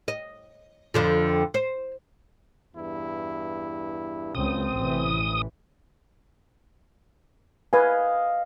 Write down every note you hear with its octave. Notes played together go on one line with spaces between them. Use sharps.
D#5
F2 D3 F3
C5
E2 G2 E4
C#2 F#2 C4 D#6
A1 C3 E3
B4 D#5 F5 G#5